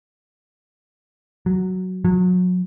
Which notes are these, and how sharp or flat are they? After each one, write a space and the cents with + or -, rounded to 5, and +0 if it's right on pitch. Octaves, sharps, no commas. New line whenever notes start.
F#3 +0
F#3 -30